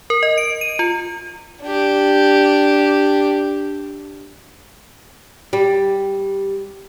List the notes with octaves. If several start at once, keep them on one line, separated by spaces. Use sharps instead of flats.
A#4
D#5
D7
D#7
F4
D4 G4
G3